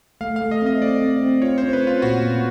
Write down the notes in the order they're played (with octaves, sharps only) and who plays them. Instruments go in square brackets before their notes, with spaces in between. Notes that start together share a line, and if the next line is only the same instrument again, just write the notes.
[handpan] A3 [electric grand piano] F5
[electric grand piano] F5
[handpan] A3
[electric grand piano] D#5
[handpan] C4 [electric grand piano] D#5
[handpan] A3 [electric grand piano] D5
[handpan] C4
C4
[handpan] F4 [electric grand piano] C#5
[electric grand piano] C5
[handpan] C#4
[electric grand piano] B4
[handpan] C#4 [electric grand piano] F4
[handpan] A#2 [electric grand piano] F#4
[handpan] B3